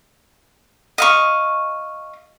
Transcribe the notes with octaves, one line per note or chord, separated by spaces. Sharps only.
D#5 F5 C#6